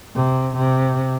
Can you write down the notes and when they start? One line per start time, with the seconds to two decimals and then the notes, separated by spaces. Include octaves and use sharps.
0.15 C3
0.57 C3